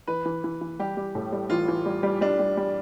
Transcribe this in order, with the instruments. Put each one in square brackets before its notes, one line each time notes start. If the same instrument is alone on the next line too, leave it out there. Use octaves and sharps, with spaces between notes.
[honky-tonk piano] E3 [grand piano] B4
[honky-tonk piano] E3
E3
E3
[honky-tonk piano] G3 [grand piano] G4
[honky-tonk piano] G3
A2
G3
[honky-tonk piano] E3 [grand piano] F4
[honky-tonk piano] E3
G3
G3
[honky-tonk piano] G3 [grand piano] D4
[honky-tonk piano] G3
G3